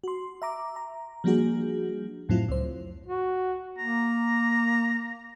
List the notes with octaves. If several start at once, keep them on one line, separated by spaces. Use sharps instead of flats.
F#4 C6
E5 A#5 D6
A#5
F3 G3 A#3 D4 F#4 G#4
F2 A2 F#3 C4 E4 F4
C#2 C5
F#4
A#3 A#5